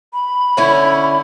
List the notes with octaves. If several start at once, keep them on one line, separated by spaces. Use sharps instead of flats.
B5
D3 C#4 E4